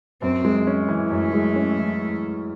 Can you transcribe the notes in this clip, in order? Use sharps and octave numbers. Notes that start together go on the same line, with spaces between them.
F#2 C4
G#3
C#4
E3
F#2 A3
G#3
C#4
E3